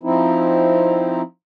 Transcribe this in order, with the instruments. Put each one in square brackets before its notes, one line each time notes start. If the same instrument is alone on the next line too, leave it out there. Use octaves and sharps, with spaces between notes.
[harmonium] F3 C4 D#4 E4